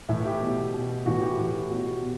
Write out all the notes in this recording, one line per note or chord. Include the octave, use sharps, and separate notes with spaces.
A2 E3 E5
G4
B2
B2
A2 E3 F#4
G4
A2 E3
B2 F#4
G4
B2